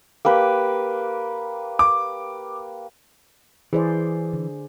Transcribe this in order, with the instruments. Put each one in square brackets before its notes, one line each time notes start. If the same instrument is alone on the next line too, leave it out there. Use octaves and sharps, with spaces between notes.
[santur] A#3 G4 B4
[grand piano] D6
[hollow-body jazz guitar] E3 [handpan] G#4 C5 D5
[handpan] D3